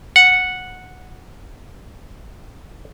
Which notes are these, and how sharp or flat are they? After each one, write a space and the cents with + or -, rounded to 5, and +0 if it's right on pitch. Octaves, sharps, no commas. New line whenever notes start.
F#5 -5